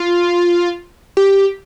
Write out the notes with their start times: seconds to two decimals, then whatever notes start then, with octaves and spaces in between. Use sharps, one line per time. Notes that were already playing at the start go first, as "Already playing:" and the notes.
Already playing: F4
1.17 G4